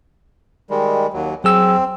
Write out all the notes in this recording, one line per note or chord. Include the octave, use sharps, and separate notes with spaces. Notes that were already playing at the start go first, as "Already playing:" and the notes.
D#3 G3 G#3
D#2 F#3
F#3 C4 G#4 E6